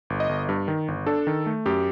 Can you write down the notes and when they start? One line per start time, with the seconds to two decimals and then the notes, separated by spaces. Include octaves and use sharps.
0.10 G1
0.20 D#5
0.29 G1
0.49 G2
0.68 D#3
0.88 G1
1.06 D4 A4
1.27 D#3
1.46 A3
1.66 F#2 G4